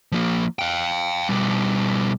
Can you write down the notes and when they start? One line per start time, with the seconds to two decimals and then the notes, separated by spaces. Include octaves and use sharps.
0.12 F3 A#3
0.59 F5 G5
1.29 B2 G3